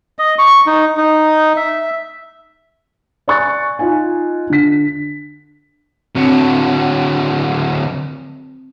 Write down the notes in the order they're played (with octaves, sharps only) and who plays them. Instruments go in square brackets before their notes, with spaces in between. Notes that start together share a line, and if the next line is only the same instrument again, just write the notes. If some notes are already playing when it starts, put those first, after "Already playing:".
[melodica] D#5
C#6
D#4
D#4
E5
[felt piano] D5 G#5 C#6 F#6 A6
D#4 F4 G#5
D3 B6
[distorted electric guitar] D3 F#3 [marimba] C4